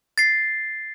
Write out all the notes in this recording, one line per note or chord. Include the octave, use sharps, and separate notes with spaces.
A6 C7